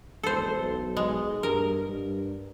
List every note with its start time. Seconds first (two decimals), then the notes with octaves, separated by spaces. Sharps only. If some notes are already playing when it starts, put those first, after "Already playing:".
0.23 E1 A4 C5
0.57 B1
0.97 G#3
1.43 G2 A#4
1.89 G2